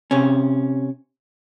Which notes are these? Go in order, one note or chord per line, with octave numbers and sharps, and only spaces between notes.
C3 C#4